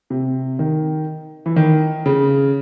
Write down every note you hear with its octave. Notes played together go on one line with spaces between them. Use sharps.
C3
D#3
E3
D#3
C#3